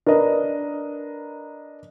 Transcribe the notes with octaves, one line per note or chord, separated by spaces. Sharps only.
D4 A#4 B4 D#5